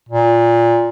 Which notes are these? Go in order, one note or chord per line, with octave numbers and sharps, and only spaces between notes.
A#2